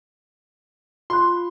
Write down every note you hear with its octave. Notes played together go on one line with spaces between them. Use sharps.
F4 B5 C6 F#6